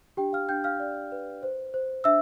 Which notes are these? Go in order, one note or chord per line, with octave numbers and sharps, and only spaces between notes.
D4 G4 G5
F5 F6
D4 G5 G6
F5 F6
D5
B4
C5
C5
D4 E5 E6